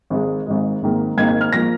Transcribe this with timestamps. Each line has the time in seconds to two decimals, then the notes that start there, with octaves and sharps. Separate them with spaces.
0.10 G#1 G#2 G#3
0.46 G#1 G#2 G#3
0.82 G#1 G#2 D#3 A#3
1.17 G#1 G#2 D#3 A#3 G#6
1.29 G#6
1.41 F6
1.53 F3 A#3 A#6